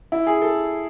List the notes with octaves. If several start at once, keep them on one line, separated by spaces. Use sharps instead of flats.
E4
G#4
A4